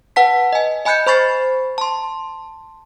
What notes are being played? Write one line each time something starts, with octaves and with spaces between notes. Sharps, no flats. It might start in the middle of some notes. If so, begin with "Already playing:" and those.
B4 F#5 A5 B6
D#5 G#5
D#5 G#5 B5 F#6 G6 C#7
C5 B5 C#6 A6 C7
A5 C6